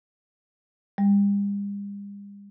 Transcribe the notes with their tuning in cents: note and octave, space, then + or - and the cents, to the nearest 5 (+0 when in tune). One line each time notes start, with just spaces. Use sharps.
G3 +45